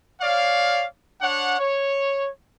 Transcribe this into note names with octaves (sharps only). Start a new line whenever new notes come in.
C#5 D5 F5
D4 C#5 F#5
C#5